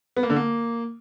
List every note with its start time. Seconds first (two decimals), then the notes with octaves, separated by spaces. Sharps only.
0.17 B3
0.23 A#3
0.30 D3
0.36 A#3